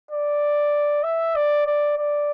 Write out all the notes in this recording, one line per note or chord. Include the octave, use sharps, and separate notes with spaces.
D5
E5
D5
D5
D5